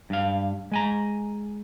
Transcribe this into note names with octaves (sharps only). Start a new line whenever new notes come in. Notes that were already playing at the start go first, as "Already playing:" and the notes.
G2 F5
G#3 G#5 A#5